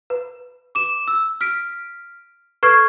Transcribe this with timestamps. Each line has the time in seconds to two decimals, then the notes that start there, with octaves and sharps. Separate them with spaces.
0.10 B4
0.75 D6 E7
1.08 E6
1.41 F6 B6 D7
2.63 A4 B4 C#6 F6 G#6 C7